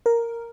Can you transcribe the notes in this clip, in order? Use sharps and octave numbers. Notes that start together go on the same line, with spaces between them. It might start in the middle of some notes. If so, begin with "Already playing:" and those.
A#4